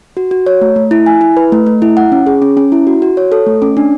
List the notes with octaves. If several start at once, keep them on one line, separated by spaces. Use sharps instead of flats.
F#4
F#4
C#5
A3
A3
E4
G#5
E4
B4
A3
A3
E4
F#5
C#4
G#4
C#4
C#4
E4
F#4
F#4
C#5
A4
A3
C#4
D4